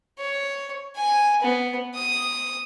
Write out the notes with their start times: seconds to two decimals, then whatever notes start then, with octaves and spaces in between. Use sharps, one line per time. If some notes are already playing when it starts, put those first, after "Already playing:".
0.19 C#5
0.96 G#5
1.42 B3
1.95 D#6